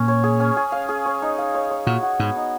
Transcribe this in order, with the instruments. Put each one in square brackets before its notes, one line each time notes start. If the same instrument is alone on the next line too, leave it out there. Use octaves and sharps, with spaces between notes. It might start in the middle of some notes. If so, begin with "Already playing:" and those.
Already playing: [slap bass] A#2 [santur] C#4
[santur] C#5
G#4
C#4
G#4
F5
G#4
C#5
D#4
F5
C#5
C#5
[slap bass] A#2 [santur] F#4
[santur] F#4
[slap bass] G#2 [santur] B3
[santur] D#4